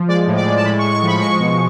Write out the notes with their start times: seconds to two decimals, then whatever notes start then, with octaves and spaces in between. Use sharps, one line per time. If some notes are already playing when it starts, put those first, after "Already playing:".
Already playing: F3
0.08 G#3 D5
0.27 A2
0.36 D5
0.46 G#3
0.56 A5
0.65 A2 B5
0.79 C#6
0.83 G#3
0.93 C#6
1.02 F3 B5
1.21 G#3 C#6
1.40 B2